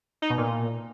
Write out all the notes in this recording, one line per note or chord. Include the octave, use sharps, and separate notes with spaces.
D#4
B2
A#2